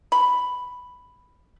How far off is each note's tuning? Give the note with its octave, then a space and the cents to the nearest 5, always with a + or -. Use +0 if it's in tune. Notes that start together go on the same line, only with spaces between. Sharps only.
B5 +5